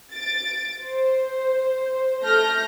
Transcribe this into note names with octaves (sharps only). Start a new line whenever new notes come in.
A6 D7
C5
A3 F6 G6 A#6